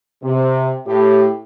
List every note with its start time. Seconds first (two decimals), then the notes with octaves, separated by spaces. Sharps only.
0.23 C3
0.87 A2 G4